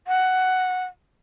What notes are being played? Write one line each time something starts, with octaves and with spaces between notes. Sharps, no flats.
F#5